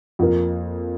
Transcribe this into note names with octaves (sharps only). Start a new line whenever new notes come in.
F2 F3 A#3